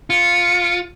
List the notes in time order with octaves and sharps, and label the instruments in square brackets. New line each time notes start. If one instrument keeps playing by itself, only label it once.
[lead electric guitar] F4 [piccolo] C#7